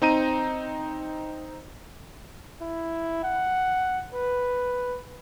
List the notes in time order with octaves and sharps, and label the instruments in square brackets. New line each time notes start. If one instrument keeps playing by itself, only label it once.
[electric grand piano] C4 D#4 A#5 D#7
[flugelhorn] E4
F#5
B4